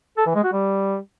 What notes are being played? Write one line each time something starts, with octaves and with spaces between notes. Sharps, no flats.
A4
E3
G#3
F#4
G3